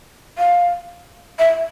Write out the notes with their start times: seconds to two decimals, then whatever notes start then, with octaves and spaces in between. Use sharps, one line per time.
0.38 F5
1.39 E5